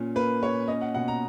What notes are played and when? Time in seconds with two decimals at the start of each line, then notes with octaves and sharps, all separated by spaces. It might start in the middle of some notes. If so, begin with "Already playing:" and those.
Already playing: A#2 C#4
0.16 A#3 B4
0.43 A#2 C#5
0.68 C#4 D#5
0.81 F#5
0.94 B2 F#5
1.08 A#5